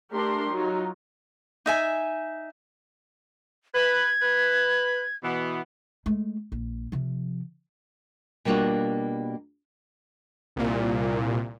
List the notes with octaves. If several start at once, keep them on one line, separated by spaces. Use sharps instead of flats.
A3 D4 G4 A#4 C6
F#3 D#4 F4
D#4 E5 G#5
B4 G#6
B4
B2 E3 B3
G#3 A3
A#1
C3 F3
B2 G3 A#3 D4 F4 F#4
C2 A#2